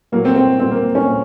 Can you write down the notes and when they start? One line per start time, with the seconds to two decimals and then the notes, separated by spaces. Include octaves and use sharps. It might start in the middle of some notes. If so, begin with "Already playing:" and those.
0.12 A#2 F#3 A#3
0.25 C4
0.36 C4
0.59 A#2 F#3 C4
0.71 A#3
0.95 C#4
1.07 A#2